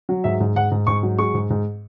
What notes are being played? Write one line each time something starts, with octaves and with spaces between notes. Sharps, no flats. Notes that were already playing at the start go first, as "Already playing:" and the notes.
F#3
G#2 E5
G#2
G#2 F#5
G#2
G#2 C#6
F#3
G#3 C#6
G#2
G#2